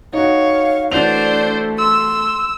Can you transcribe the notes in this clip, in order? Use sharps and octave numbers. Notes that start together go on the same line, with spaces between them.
D#4 F#4 C#5 F5
E3 A3 D4 F#4 C5 D5 F7
C6 E6